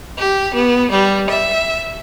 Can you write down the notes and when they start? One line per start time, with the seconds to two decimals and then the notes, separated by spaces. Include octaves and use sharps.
0.17 G4
0.52 B3
0.91 G3
1.30 E5